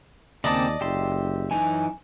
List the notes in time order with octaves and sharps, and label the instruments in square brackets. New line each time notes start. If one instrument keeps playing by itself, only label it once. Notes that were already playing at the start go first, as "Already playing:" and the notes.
[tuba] D#2 [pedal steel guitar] C#3 A#3 C4 [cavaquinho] D5 D#5 A5
[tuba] F#1 [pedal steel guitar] G4 E5 C6
[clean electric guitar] F#2 G#5 [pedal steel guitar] E3 D#4